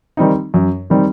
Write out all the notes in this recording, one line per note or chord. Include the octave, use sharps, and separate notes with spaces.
D#3 G3 C4 D#4
F#2
D#3 G3 C4 D#4